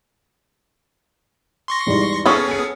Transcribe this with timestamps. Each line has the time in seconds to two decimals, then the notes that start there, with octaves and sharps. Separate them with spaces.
1.68 C6 C#6 A#6
1.87 E2 G#2 G3
2.26 B3 C#4 G#4 A4 C#6 D#6 F6
2.51 C#7